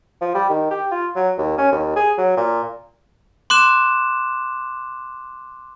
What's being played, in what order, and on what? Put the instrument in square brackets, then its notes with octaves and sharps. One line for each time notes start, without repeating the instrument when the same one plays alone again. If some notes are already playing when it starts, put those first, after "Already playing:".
[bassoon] F3
G3
D#3
G4
F4
F#3
D#2
C#4
D#2
G#4
F#3
A#2
[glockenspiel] C6 D6 F#6 E7